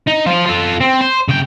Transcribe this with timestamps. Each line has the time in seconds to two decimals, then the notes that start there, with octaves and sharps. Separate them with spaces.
0.08 D#4
0.27 F3 F4
0.46 F4 A4
0.81 C4
1.01 C5
1.28 C#3 G5